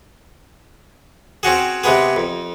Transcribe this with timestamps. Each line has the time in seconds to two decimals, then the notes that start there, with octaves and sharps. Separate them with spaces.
1.43 C4 C#4 F#4 G#4
1.84 C3 G#3 B3 G#4
2.16 F2